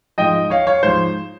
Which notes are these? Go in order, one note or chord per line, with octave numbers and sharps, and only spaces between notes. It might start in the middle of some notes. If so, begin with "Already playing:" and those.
G#2 F3 D#5 G5
C#5 F5
C#5 F5
G#2 F3 C5